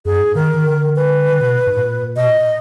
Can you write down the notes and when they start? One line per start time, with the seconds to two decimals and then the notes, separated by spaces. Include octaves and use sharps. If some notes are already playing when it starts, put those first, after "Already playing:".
0.05 F#2 G#4
0.20 G#2
0.35 D#3 A#4
0.54 D#3
0.65 D3
0.96 B4
1.32 D3
1.41 B2
1.67 G#2
1.76 A#2
2.16 B2 D#5
2.26 A#2